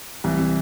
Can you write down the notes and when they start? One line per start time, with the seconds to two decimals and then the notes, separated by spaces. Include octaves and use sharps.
0.24 C2 E3
0.39 C3